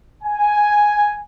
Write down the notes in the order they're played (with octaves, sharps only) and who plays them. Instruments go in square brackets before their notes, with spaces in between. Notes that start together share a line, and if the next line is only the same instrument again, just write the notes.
[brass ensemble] G#5